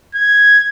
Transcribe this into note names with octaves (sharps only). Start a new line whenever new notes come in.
G#6